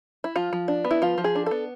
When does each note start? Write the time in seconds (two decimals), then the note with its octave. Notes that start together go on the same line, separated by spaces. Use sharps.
0.24 E4
0.36 F3 F4
0.53 F3
0.68 D4
0.85 B3
0.91 E4
1.02 F3 F4
1.18 F3
1.24 G#4
1.35 D4
1.46 B3 A4